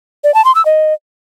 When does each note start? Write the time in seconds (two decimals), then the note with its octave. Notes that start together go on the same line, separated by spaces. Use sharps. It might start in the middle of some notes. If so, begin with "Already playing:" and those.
0.24 D5
0.34 A5
0.45 C6
0.55 E6
0.66 D#5